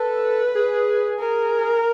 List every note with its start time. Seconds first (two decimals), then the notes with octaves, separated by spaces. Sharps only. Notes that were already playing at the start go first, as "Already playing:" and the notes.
Already playing: A4 B4
0.55 G#4
1.19 A#4